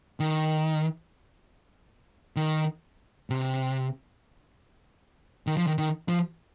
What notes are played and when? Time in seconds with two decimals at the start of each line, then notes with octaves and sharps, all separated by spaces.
0.20 D#3
2.36 D#3
3.30 C3
5.47 D#3
5.57 F3
5.67 D#3
5.78 D#3
6.08 F3